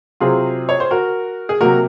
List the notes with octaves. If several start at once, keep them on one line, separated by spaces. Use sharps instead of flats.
C3 F#3 C4 F4 G#4
C#5
C5
F#4 A#4
G#4
C3 F#3 A#3 F#4 A#4